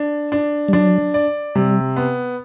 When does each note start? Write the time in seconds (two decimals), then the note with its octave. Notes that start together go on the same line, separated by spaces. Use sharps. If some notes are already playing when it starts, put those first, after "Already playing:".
Already playing: D4
0.32 D4
0.68 G3
0.73 F#3 D4
1.14 D5
1.55 C3 G3
1.96 B3